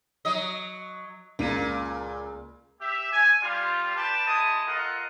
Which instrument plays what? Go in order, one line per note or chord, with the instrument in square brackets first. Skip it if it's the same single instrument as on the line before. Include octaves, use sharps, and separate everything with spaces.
[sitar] F#3 D#5
[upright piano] C#2 A#3 D#7 [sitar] A#2
[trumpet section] G4 E5
G#5
G3 F4
B4 D5 G5 A5
G#3 E4 A5 D#6
F4 A4 A#4 D#5 F#5